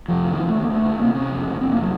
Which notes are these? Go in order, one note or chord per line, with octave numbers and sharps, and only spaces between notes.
F1 F3
C#3
D#3
F1 F3
A3
D#2
A#3
C#2 A3
C#2
C3 A#3
C3 C#4
F1
C#3
F1 C4
A#3
F#3